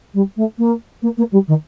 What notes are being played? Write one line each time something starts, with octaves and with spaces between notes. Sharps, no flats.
G3
A3
A#3
A#3
A#3
G3
D#3